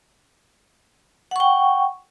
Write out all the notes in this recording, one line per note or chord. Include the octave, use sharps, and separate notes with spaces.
F#5 G5 C#6